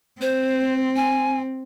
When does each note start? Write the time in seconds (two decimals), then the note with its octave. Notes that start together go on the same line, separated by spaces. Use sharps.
0.21 C4 C5
0.96 G#5